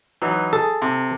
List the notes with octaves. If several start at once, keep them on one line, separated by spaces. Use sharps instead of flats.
E3 F#3 D#4
G#4 A4
C3